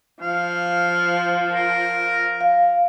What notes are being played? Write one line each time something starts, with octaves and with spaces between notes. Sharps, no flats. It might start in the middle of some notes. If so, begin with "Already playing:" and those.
F3 F5
A#4
F5